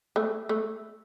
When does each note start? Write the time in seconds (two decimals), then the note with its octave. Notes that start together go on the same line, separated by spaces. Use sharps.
0.16 A3
0.49 A3